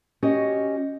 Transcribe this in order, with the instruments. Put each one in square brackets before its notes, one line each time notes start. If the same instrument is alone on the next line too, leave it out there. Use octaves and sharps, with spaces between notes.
[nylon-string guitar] C#4 F#4 G4 D#5